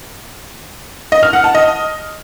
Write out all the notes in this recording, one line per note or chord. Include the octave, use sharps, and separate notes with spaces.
D#5
F6
F#5
A5
D#5